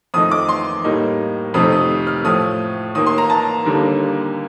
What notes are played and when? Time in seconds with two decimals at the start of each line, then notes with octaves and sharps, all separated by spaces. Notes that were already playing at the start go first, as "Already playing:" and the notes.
0.14 F2 D#3 A3 D#4 D#6
0.31 D6
0.49 C6
0.84 A2 G3 A#3 D#4
1.54 F2 C3 D#3 A3 D#6
1.72 D#6
2.07 F6
2.24 A2 F3 A3 D#6
2.95 D#2 D#3 A#3 D#6
3.06 C6
3.18 A#5
3.30 A5
3.65 D#2 D3 G3 A#3